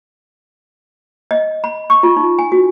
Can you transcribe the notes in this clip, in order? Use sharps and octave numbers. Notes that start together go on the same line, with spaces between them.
D#5
B5
C#6
F4
D#4
G#5
F#4